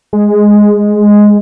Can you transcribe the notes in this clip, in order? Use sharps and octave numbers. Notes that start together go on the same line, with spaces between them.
G#3